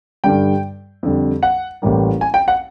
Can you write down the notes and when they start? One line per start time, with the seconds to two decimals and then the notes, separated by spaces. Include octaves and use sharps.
0.24 G2 D3 G3 G5
1.03 F2 D3 G3
1.43 F#5
1.82 A1 A2 E3 G3 A#3
2.21 G#5
2.34 G5
2.48 F#5